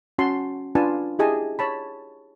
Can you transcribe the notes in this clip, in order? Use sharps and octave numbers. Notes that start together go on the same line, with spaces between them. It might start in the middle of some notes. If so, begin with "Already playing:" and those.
C#4 F#4 A5 C6
D4 F4 B4 G#5 A5
E4 G4 G#4 D#5 G#5 A5
C#5 A5 B5